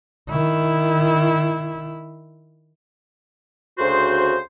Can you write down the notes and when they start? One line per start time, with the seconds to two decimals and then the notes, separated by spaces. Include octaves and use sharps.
0.29 D#3 E4
3.79 D2 C#3 F#4 C5